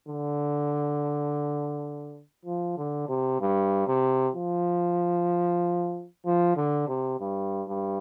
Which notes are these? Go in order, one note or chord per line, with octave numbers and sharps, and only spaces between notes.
D3
F3
D3
C3
G2
C3
F3
F3
D3
C3
G2
G2